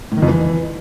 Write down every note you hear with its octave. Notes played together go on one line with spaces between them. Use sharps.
A2
D#3
F2
E3